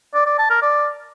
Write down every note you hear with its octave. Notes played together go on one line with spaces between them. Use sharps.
D5
D5
A5
A#4
D5